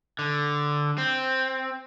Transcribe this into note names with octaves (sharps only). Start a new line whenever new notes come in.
D3
C4